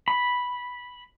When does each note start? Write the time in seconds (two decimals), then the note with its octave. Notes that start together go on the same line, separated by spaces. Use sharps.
0.08 B5